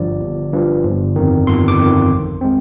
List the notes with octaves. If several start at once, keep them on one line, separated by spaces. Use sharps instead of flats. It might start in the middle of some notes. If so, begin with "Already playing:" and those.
Already playing: G1 G2 F3 D5
G1
G2 F3
G1
F2 D#3
G1 C6
D6
F2 D#3
A#1
G#3 C4